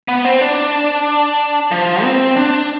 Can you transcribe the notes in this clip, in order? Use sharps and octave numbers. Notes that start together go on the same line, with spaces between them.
B3
C4
D4
F3
C4
D4